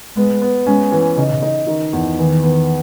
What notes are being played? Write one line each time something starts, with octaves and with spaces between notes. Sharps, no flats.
G#3 B3
B3
G#3 C#4
E3
C#3 D#4
D#4
D#3
E2
D#3 E3
B3